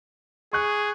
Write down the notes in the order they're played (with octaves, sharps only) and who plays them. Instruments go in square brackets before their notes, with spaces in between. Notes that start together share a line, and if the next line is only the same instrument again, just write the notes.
[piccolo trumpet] G#4 [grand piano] C#6 F#6